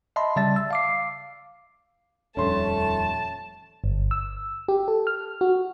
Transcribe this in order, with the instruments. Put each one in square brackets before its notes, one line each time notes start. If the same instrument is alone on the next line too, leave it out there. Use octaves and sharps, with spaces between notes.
[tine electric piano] D#5 E5 A5 B5 C6
C#3 G3 D5 E5 A5 A6
E6
F5 D6 C7
[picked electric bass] D#1 F2 G3 [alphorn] A3 [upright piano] C#4 C6 [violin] A5
[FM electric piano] G1
E6
G4
A4
F6
F#4